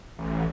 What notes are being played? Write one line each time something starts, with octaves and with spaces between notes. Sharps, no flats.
A1